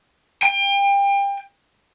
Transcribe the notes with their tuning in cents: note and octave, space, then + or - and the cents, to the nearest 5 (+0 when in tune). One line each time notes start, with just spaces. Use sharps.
G5 +30